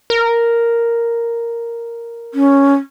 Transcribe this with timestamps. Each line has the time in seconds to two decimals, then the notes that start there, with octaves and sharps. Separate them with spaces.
0.10 A#4
2.34 C#4